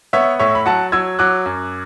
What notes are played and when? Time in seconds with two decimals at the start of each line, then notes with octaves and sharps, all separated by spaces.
0.13 B3 C#5 E5
0.39 A2 C#5 E5
0.55 B5
0.66 F#3 F#5 A5
0.92 F#3 E6 G#6
1.19 F#3 D6 F#6
1.46 F#2